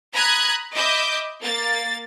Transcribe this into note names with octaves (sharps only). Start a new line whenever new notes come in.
A#5 B5 D#6 F#6 G#6
D#5 E5 B5 D6 G6
A#3 A6